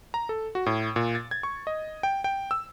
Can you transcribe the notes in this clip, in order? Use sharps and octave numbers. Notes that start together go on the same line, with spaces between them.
A#5
A4
F#4
A2
A#2
A6
G#6
C#6
D#5
G5
G5
E6